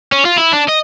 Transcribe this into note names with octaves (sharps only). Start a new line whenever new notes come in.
C#4
F4
E4
D4
D#5